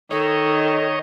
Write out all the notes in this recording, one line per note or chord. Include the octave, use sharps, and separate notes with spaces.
D#3 A4 C#5 D#5